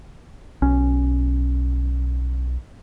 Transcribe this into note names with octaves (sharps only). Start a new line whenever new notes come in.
B1 C#4